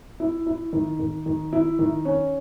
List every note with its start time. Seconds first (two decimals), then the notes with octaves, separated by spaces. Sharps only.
0.20 E4
0.47 E4
0.73 D#3
0.99 D#3
1.26 D#3
1.53 E4
1.79 D#3
2.05 C#4